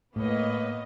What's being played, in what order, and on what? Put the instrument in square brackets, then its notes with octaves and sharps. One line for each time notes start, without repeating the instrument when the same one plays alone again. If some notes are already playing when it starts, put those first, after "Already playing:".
[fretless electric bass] A2 [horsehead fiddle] A#3 B4 [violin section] B3 C#5 D#5